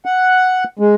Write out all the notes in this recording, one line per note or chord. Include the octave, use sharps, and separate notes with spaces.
F#5
G#3